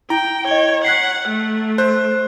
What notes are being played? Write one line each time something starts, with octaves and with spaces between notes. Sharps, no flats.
E4 G5 A#5
C#5 D#5 G7
F#5 F#6 B6 C7
A3
C5 F#6